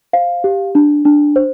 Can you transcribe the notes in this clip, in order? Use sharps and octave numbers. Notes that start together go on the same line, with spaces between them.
C5 F5
G4
D4
D4
C5